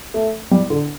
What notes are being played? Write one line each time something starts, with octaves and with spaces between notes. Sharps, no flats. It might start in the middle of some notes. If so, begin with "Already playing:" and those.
A3
G3
D3